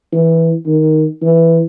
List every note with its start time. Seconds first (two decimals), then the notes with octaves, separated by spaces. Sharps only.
0.13 E3
0.67 D#3
1.22 E3